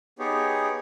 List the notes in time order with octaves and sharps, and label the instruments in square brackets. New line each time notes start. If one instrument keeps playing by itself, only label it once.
[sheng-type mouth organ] B3 D#4 G4 G#4 C#5